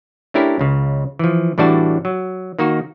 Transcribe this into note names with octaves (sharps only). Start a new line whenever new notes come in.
A3 C#4 D4 E4 G4 A#4
C#2 C#3
E3 F3
A2 E3 G3 D4 F#4 A5
F#3
D#3 A#3 D#4 F#4